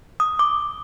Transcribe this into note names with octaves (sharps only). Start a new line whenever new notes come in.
D#6
D6